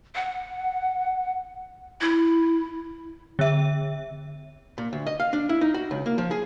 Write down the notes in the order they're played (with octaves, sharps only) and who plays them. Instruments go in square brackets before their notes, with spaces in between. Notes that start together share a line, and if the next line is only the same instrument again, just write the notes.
[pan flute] F#5
E4
[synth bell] D3 E5
[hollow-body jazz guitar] A#2
D2
D#5
F5
D4
E4
D#4
F#4
C#2
A#3
F3
G#4